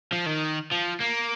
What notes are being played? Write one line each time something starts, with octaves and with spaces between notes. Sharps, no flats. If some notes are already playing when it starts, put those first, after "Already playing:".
F3
D#3
F3
A#3